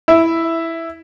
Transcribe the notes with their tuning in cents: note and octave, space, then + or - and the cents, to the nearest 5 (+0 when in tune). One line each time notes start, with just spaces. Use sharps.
E4 +0 E5 +0